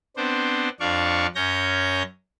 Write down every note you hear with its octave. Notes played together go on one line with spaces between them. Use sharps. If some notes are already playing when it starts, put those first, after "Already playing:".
B3 C4 D4 C5
F2 D4 D5 F5 C#6
F#2 C#4 C#5 G6 A#6